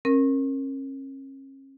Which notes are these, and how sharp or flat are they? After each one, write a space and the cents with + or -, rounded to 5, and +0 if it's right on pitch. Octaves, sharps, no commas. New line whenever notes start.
C#4 -40 A#4 +0